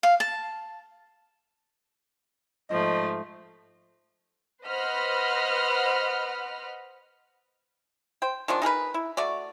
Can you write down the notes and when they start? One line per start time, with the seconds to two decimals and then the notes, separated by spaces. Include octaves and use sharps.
0.03 F5
0.20 A5
2.70 G#2 F3 A3 D#5
4.65 B4 C5 D#5 F#5 B5 F6
8.22 C5 G5
8.48 D#3 F3 G#3 D4
8.62 D#4 G#4 A#4 B4
8.94 E4
9.17 A3 F#4 D5